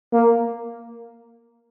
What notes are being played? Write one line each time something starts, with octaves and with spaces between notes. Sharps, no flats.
A#3